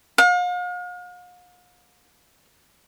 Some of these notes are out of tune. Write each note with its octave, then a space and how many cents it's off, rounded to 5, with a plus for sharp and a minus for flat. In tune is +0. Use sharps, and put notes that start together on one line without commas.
F5 +45